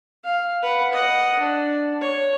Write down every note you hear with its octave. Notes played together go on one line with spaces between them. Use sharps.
F5
B4 F#5
D#5 F#5
D4
C#5